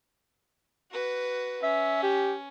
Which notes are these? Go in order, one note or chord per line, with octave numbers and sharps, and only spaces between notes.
F#4 B4
C#4 E5
G4